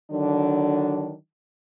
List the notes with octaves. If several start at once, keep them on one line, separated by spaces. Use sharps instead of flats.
D3 D#3 F#3 D4